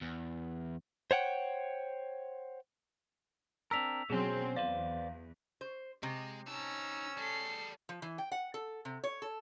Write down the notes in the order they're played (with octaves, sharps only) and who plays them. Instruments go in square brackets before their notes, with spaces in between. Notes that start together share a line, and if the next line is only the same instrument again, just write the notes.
[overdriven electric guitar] E2
[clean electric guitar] C5 C#5 F#5 G5
[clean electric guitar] C4 D4 A#4 [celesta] E6 B6 F7
[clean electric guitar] B2 C#4 [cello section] F#3 C4 C5 [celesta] G#4
[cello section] E2 [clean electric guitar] B4 C5 D5 [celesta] F5
[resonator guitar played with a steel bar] C5
[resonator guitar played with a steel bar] C3 [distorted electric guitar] G#3
[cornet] C#4 [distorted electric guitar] D#4 A5 [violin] A#5 E6
[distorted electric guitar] G3 G#4 [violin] A4 C7
[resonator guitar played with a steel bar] F3
E3
G5
F#5
A4
C3
C#5
A4